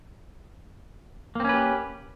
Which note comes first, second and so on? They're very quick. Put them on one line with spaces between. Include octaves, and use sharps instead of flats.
A#3 C4 C#4 B4 G4